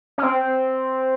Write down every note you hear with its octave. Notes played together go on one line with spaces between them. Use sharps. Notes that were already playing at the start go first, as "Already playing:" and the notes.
C#4
C4